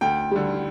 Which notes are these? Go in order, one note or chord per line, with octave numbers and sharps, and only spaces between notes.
D2 G5
D3 G3